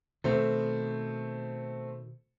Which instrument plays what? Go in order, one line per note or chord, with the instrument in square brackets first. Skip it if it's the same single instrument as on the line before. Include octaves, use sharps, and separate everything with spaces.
[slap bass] B2 D#3 [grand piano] A3 C4